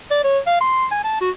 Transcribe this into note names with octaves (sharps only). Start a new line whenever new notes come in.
D5
C#5
F5
C6
G#5
A5
F#4